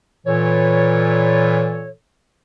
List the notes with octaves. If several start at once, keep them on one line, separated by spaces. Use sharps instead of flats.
A#2 E3 A4 C#5